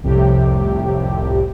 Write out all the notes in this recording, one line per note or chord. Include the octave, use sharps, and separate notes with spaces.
C2 F2 A2 C3 G4